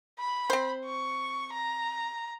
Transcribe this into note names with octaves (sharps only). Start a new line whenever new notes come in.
B5
C4 C5
C#6
A#5